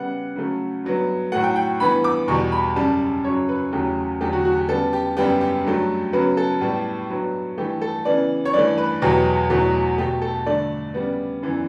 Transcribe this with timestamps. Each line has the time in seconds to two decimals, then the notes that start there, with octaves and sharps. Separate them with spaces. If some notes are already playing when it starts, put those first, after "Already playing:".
Already playing: C#3 G3 B3 F#5
0.36 C#3 F#3 A3
0.84 G2 F#3 B3
1.32 A2 F#3 A3 F#5
1.44 G5
1.56 G5
1.80 G2 E3 B3 B5
2.04 D6
2.28 E2 B2 G3 C#6
2.52 B5
2.76 F#2 C#3 G3 A5
3.24 F#2 C#3 F#3 C#5
3.49 B4
3.72 E2 C#3 F#3 A3 G4
4.21 E2 D3 F#3 A3 G4
4.33 F#4
4.45 F#4
4.57 G4
4.68 C#3 G3 B3 A4
4.93 G4
5.17 F#2 C#3 G3 B3 G4
5.41 G4
5.64 G2 F#3 A3
6.13 C#3 F#3 B3 B4
6.37 A4
6.61 A2 G3 B3
7.10 G2 F#3 B3
7.58 G2 E3 A3 G4
7.82 A4
8.05 C#3 E3 B3 D5
8.45 C#5
8.53 G2 E3 A3 D5
8.78 B4
9.02 E2 B2 F#3 B3 G4
9.50 E2 B2 F#3 A3
9.98 B2 A3 G4
10.22 A4
10.46 G2 D3 A3 D5
10.94 C#3 G3 B3
11.42 F#2 E3 B3